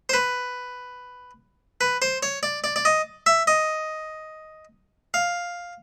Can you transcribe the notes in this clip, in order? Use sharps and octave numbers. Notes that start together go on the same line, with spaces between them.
C5
B4
B4
C5
C#5
D5
D5
D5
D#5
E5
D#5
F5